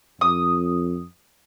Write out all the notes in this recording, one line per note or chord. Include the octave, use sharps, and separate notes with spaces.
F2 D#6